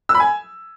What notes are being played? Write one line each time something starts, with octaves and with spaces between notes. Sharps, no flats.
E6
B5
G#5